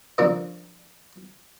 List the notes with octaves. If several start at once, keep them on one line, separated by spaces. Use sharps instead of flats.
D3 F3 G3 A#3 C4 C#4